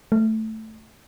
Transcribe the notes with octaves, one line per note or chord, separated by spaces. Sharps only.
A3